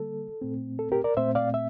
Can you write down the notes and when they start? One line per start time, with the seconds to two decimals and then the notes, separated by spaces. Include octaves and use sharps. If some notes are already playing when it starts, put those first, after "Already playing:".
Already playing: D3 G3 A#3 A4
0.42 A#2 A3 C4
0.79 A4
0.92 G4 A#4
1.04 A#4 D5
1.17 A#2 A3 C4 C5 E5
1.35 D5 F5
1.54 E5